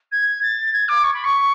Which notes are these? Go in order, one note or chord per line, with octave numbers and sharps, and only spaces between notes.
G#6
A6
G#6
D6
C#6
B5
C#6